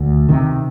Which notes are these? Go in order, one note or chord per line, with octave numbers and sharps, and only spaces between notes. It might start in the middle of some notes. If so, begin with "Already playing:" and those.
Already playing: D2
C3 D#3